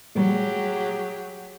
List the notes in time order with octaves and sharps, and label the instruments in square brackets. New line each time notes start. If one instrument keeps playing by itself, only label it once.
[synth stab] A#2 G3 [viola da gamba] F#3 G4 G#4